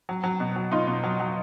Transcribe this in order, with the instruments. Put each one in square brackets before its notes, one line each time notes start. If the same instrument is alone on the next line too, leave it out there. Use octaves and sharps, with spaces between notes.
[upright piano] F#3
F#3
B2
F#3
B2 D#4 F4
B2
F#3
F#3